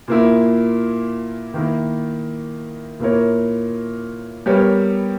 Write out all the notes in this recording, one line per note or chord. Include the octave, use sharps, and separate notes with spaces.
A#2 A#3 E4
D#3 A#3 E4
A#2 A#3 E4 A#4 C#5
G3 B3 G4 A#4 C#5